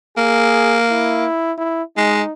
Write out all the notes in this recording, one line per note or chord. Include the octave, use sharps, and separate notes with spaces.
A#3 G#4
E4
E4
G#3 D#4